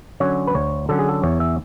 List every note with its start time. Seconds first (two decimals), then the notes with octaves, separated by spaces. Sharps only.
0.20 D3 F#3 C#4 C#5
0.47 B4
0.55 D2 C#5
0.89 D3 F#3 C#4 A4
0.99 G#4
1.09 A4
1.23 E2 C#5
1.40 E5